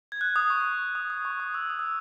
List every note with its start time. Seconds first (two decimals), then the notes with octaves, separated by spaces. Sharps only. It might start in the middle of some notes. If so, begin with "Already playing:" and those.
0.12 G#6
0.21 F#6
0.36 D#6
0.50 C#6
0.61 D#6
0.95 D#6
1.10 D#6
1.25 C#6
1.40 D#6
1.54 E6
1.69 D#6
1.79 E6